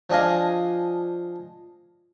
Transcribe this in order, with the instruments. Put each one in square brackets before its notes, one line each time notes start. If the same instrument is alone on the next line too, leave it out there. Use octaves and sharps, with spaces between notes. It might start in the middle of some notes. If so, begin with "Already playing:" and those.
[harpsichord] F3 D4 G#4 D#5 F5